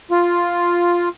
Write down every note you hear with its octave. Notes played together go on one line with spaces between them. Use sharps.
F4